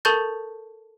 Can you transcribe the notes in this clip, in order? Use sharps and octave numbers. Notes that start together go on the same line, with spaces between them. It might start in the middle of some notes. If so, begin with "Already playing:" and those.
A4 A#4 A5 C#6 G6 A6